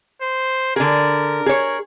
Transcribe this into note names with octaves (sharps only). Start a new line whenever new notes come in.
C5
D3 G#4 A#4
G#4 C#5